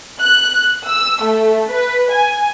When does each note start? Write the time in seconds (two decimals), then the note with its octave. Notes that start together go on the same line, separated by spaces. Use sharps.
0.20 F#6
0.86 E6
1.23 A3
1.71 B4
2.12 G#5